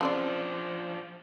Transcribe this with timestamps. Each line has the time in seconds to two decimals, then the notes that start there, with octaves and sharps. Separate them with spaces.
0.01 C#3 F3 C4 D4 D5